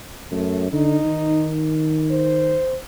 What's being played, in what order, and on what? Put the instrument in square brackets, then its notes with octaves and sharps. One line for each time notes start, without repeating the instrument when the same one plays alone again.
[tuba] F#2 [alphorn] A3
[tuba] D3 [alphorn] D#4
[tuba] D#3
[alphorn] C5